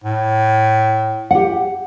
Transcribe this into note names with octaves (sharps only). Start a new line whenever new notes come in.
A2
G4 F#5